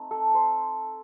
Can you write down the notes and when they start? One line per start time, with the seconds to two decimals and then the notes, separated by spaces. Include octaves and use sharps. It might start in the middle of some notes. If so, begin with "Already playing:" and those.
Already playing: A3 C4 D#4
0.11 A4
0.35 C5